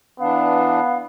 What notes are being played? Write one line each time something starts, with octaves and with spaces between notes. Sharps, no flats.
E3 B3 D4 F5